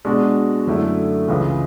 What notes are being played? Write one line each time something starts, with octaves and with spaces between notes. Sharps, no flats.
B2 G#3 D4 F#4
F#2 D3 A3 E4
C#2 C#3 E3 G#3